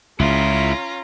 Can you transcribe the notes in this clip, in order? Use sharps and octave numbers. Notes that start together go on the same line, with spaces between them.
C#2 C#3 C#4 E4 F4 A#5